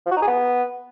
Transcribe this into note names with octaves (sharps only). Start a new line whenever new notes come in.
F3
F#4
D#4
G#4
B3